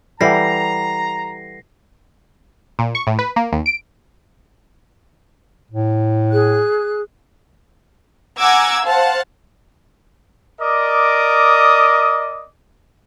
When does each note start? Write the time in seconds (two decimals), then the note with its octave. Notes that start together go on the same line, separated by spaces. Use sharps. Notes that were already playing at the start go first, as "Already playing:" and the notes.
0.21 E3 G3 A4 F#5 A#5 A#6 C7
2.79 A#2
2.95 C#6
3.07 A2
3.19 B4
3.36 A#3
3.52 D#2
3.66 D7
5.71 A2
6.31 G#4 F#6
8.38 F#5 G#5 A#5 D6 E6 G#6
8.84 C5 F5 F#5 A5
10.60 A#4 D5 D#5 D6 D#6